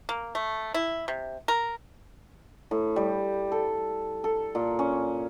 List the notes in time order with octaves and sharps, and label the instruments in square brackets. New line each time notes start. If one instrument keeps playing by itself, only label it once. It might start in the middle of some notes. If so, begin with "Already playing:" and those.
[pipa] A#3
A3
E4
C3
A#4
[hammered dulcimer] A2
G3
A4
A4
A#2
C#4